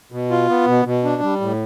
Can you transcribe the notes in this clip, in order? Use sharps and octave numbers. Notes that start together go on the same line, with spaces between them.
B2
F4
B3
B2
B2
D4
G3
A2